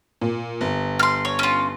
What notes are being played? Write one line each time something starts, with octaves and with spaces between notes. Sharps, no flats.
A#2
G1
C6 F6
C#5
C#4 F4